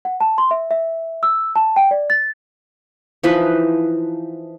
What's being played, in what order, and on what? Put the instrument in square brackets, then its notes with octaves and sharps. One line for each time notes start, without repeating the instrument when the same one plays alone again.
[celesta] F#5
A5
C6
E5
E5
E6
A5
G5
D5
A6
[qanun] E3 F3 D#4 B4